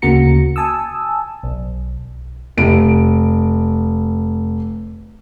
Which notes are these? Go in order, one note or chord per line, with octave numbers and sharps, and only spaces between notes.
D2 C#3 A#3 F#4 A#5 C#7
G#5 A5 D#6 E6
B1
F1 D7